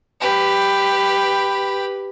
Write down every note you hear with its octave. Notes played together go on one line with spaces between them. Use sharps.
G4 B4